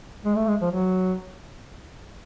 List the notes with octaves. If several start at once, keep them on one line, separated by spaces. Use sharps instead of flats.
G#3
A3
G#3
F3
F#3